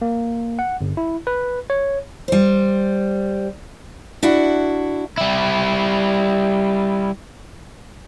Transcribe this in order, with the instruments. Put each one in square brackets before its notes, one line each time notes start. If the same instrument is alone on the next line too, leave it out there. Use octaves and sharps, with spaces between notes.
[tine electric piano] A#3
F#5
G1
E4
B4
C#5
[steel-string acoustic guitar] G3 C5
D4 E4 F#4 F#5
[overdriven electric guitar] G3 E4